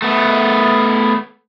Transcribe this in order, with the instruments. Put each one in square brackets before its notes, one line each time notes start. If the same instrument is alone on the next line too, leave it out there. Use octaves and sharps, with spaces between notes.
[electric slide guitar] A3 B3